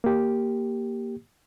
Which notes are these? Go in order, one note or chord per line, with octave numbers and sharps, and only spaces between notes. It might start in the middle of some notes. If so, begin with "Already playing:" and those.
A#3 G4